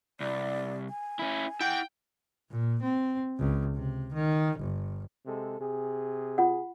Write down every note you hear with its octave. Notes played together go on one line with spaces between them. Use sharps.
C2 D5
G#5
C#4 E4
E4 F#5 G5
A#2
C4
C#2
C3
D#3
G1
C3 G#3 A4
C3 G#4
F4 F#5